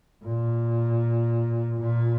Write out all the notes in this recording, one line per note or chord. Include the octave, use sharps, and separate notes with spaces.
A#2
A#2